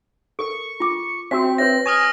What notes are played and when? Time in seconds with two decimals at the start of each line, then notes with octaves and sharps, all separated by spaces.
0.39 A4 A#4 C#6
0.80 F4 D6
1.31 C4 F#4 E5 B6
1.58 B4 C#5 E5 A#6
1.86 G#5 C#6 D#6 F6